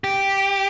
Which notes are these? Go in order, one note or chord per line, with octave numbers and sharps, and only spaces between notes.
G4